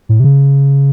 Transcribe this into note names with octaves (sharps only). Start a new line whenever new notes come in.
A2
C3
C#3